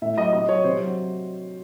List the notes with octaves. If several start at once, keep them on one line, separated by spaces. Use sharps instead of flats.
A2 E5
F#3 D#5
C3 D#5
F#3 C#5
C3 C5
F#3